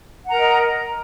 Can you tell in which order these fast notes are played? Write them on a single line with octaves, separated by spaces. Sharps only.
F#5 A#5 A#4 D#5